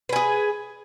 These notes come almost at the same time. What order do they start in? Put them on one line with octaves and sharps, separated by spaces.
B4 G#5 G#4